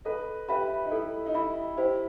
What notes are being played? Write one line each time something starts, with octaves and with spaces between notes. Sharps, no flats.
A4 B4 D#5
G4 B4 E5 B5
D#4
E4 A4
D#4
E4 E5 B5
E4 G4 C5